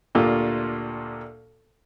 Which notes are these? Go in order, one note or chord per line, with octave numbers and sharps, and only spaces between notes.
D2 A#2 A#3 F4 G4